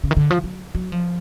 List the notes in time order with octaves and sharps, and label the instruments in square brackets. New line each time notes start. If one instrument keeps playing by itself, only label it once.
[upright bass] C#3
D#3
D3
F3
F#3
F#3
F3